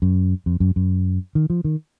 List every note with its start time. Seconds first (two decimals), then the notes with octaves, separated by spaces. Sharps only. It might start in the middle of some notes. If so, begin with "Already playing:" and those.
0.02 F#2
0.46 F2
0.60 F#2
0.76 F#2
1.35 D#3
1.50 F3
1.64 D#3